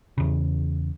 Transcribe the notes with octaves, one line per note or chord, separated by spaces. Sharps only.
E2 C#3